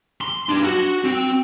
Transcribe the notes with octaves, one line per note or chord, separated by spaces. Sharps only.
C6
D4 G4
F#4
C4